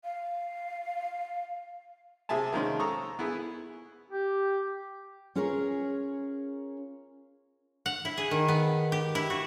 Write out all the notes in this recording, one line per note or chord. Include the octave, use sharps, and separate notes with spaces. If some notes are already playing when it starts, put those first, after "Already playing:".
F5
C3 G#4 E5 G#5 A5
D#3 F3 G#3 C#4
A4 A#5 C#6 D#6
B3 E4 G#4
G4
C#4 F4 G#4 A#4 C#5
F#5
E4
G#4
D#3
B3
G4
E4
F#4